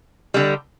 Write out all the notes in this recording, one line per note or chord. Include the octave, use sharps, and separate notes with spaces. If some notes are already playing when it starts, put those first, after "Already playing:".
D3 G3